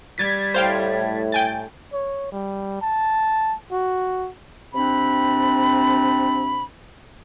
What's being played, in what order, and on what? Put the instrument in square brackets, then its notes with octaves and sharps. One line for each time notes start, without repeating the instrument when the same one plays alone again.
[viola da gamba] G3 [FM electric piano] G#6 A6 B6
[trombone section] A2 [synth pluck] C5 F5 G5
[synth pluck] G5 G#5 A6
[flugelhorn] C#5
G3
A5
F#4
[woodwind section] C3 C4 D4 B5